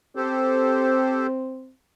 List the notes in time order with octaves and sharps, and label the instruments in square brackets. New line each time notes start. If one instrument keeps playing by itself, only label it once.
[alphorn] C4 [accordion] G4 A4 C5